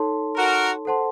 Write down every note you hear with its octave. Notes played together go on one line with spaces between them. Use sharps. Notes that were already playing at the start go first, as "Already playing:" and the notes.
Already playing: D#4 A4 C#5 A5 C6
F#4 A#4
A4 C5 F#5 A5 C6